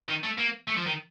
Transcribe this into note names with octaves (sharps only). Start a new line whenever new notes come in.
D#3
A3
A#3
A3
F3
D#3